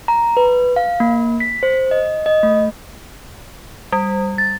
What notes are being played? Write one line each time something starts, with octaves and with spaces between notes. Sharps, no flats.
A#5
B4
F5
A#3
B6
C5
D#5
D#5
A3
G3
A6